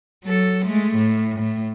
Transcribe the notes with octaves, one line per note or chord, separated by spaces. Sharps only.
F#3 A4
G#3 A3
A2
A2